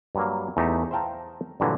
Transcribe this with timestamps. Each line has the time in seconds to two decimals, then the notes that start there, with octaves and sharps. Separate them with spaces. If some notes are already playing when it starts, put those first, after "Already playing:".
0.15 G2 F#3 A#3
0.57 E2 A3 D#4 G4 E5
0.91 C5 E5 F5 G5 A5 A#5
1.60 G2 A#2 D3 E3 F#3